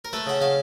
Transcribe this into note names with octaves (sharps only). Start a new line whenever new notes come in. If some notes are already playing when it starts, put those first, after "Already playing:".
A#4
A3 B4
C#3 F#5
C#3 F5